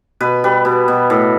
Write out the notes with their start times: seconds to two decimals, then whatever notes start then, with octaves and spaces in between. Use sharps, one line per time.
0.21 B2 B4
0.44 G3 B4
0.65 B2
0.88 B2
1.10 A2